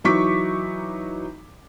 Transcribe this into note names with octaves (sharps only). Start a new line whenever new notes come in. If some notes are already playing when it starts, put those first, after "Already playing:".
E3 F#3 D#4 C#6 D6 B6